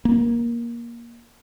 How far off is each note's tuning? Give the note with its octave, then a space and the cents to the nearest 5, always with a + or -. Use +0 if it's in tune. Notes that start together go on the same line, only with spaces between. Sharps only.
A#3 +15